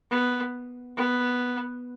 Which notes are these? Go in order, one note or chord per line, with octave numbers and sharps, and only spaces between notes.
B3
B3